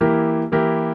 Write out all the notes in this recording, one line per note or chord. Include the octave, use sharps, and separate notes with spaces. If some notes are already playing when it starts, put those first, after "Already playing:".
E3 A#3 E4 G4 A#4
E3 A#3 E4 G4 A#4